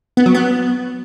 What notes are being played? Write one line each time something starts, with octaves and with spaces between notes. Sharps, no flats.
B3
F#3
B3